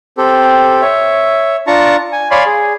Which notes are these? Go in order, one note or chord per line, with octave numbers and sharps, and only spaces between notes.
C4 G4 A4
C#5 E5
D4 F4 A5 A#5 C#6
G#5
C#5 D5 F5 G#5 B5 C6
G#4